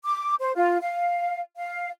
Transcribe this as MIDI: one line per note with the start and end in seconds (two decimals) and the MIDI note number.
0.04 0.34 86
0.39 0.52 72
0.55 0.77 65
0.82 1.40 77
1.57 1.89 77